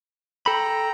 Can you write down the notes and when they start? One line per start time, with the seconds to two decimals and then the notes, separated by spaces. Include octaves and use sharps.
0.46 A4 G5 A#5 B5